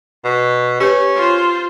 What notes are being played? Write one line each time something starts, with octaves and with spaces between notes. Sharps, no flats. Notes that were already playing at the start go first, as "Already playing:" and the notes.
B2
C#4 G4 B4
F4 C5